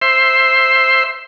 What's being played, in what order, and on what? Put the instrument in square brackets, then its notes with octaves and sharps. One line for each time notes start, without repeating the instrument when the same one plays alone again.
[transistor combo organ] C5 E5 C6